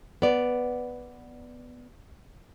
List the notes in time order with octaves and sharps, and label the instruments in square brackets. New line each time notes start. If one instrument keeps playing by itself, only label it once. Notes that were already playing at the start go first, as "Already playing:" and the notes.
[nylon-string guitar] B3 D5